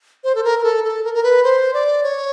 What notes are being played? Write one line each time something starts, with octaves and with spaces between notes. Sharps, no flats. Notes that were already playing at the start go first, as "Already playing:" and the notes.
C5
A4
A#4
A#4
A4
A4
A#4
A#4
B4
C5
D5
C#5